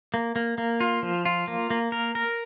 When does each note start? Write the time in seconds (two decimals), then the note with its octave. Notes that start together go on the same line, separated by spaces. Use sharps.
0.14 A#3
0.36 A#3
0.58 A#3
0.80 F4
1.03 F3
1.25 F4
1.48 A#3
1.70 A#3
1.92 A#4
2.15 A#4